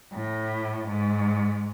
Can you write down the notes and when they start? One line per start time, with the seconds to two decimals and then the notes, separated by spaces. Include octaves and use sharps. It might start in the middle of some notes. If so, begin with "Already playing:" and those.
0.14 A2
0.88 G#2